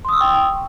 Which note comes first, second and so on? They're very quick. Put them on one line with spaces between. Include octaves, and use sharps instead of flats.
C6 D#6 E6 C#6 G5